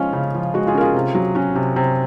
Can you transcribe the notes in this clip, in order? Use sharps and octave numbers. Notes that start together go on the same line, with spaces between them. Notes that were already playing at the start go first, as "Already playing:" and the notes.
Already playing: F3 G#3 C#4 F4
C#3
F3
G#3 F#4
F4 G#4
C#4 A#4
F4 G#4
C3
F#3
C#4 F#4
C3
C3